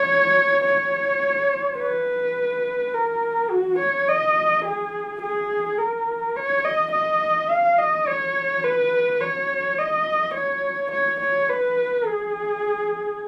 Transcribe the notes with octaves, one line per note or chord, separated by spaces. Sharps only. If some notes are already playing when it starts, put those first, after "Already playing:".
Already playing: C#5
C#5
B4
A#4
F#4
C#5
D#5
G#4
G#4
A#4
C#5
D#5
D#5
F5
D#5
C#5
B4
C#5
D#5
C#5
C#5
C#5
B4
G#4